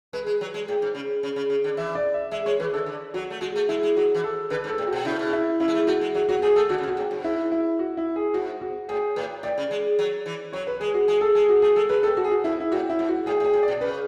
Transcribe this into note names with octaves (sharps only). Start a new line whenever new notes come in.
G#3 B4
G#3
F#3
G#3
A2
G#2
C#3
C#3
C#3
C#3
D3
E3 E5
D5
E5
G#3 E5
G#3 C#5
E3 B4
D3 A4
D3
F#3 F#4
A3
G#3 F#4
A3
G#3 E4
G#3
F#3 F#4
E3
A4
D3 B4
G#2
A4
A2
F#4
B2
C#3 E4
B2
E4
C#3 E4
G#3
A3
A3 F#4
G#3
F#3 F#4
F#3 F#4
A3 G#4
A3 A4
D3 F#4
C#3
B2
F#4
A2
G#2
E4
E4
F#4
E4
G#4
G#2 F#4
F#4
A2 G#4
A2 B4
A2 D5
C#3
G#3
F#3
E3
F#3 C#5
B4
G#3 G#4
F#4
G#3 G#4
A4
G#3 G#4
F#4
A3 G#4
G#3 A4
F#3 B4
A2 A4
F#4
G#4
F#4
G#2 E4
E4
A2 F#4
E4
G#2
F#4
A2 G#4
A2
G#4
A2
D5
B2
C#3 B4